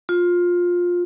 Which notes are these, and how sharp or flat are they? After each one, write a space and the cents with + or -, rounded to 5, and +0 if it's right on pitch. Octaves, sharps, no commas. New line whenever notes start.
F4 +15